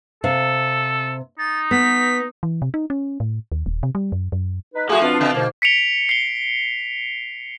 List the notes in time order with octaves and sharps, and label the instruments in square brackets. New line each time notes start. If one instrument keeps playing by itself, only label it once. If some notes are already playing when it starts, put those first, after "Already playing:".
[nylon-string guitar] C3 F5 [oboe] A4
[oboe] D#4 [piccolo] A6
[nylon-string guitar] B3 [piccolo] B6
[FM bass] E3
C3
D#4
C#4
A2
D#2
D#1
C3
G3
F#2
F#2
[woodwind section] D#4 B4
[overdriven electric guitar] F3 [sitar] A3 F#4 [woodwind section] G#4
[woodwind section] B2 C4 D4 [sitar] F4
[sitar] C#3 [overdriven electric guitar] F3
[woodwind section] G#2 B2 D3 [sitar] A#3
[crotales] B6 C#7 D7 F7 G7
C7 G7